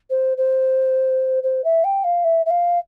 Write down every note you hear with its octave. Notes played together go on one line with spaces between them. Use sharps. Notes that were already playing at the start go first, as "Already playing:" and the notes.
C5
C5
C5
E5
G5
F5
E5
E5
F5